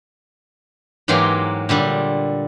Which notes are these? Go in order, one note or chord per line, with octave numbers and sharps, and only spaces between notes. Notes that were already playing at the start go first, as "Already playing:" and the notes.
G#2 E3 F#3 A#3 G4 C6
A#2 D3 G3